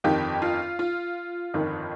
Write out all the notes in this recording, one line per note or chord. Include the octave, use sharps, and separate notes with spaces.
G1 F2 D#3 G4
F4
F4
G1 F2 D#3